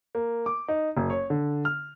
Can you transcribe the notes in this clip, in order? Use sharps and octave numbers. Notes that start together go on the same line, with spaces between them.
A#3
D6
D#4
F#1
C#5
D3
F6